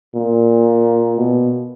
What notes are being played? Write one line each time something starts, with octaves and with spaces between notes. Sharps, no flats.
A#2
B2